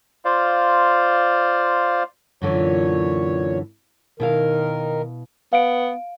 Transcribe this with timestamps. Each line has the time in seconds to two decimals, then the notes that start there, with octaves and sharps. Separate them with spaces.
0.25 F4 C5 D5 F5
2.42 F#2 A#2 D3 E3 C#5
4.20 B2 D#3 E4 A#4 F5
5.53 B3 F5 D7